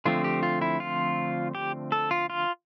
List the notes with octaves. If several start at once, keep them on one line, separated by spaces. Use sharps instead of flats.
D3 F3 A3 C4 F4
G4
F4
E4
F4
G4
A4
F4
F4